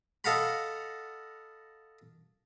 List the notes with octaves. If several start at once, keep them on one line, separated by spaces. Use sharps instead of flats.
A4 D#5 F5 F#5 A#5 B5